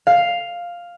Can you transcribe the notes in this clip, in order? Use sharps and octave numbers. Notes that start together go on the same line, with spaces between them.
F5